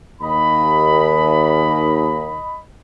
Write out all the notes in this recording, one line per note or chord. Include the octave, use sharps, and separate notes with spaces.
D#2 D#5 B5